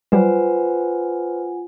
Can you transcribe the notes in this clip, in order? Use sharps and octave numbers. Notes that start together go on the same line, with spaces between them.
F#3 G3 F4 B4 C5 F#5 G#5